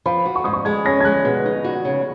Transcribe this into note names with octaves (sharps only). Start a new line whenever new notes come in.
F3 B5
F#4
C#6
G#2 D#6
C#6
G#3 G#6
C#4 A#6
G#6
G#3 F#6
B2
D#4
F#4
C#3